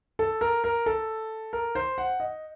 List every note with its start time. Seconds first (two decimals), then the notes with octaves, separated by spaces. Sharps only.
0.19 A4
0.41 A#4
0.64 A#4
0.86 A4
1.53 A#4
1.75 C5
1.98 F#5
2.20 D#5